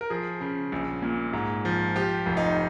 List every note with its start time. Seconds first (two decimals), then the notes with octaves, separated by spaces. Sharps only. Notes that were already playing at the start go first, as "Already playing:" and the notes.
0.01 A#4
0.10 F3 G#4
0.41 C#3
0.72 A#1
1.02 A#2
1.33 G#2
1.65 F3
1.95 F3 G4
2.26 F1
2.37 D#4